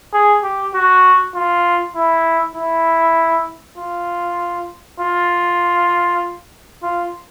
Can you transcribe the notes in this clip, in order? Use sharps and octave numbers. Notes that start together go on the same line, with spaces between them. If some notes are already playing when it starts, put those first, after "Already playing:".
G#4
G4
F#4
F4
E4
E4
F4
F4
F4